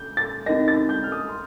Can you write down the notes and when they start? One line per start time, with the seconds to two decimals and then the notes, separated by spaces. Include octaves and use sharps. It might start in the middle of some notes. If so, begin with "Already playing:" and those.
Already playing: G6
0.17 A6
0.46 C4 D#4 A#4 D#5 A#6
0.68 A6
0.89 G6
1.04 F6
1.12 D#6
1.28 C6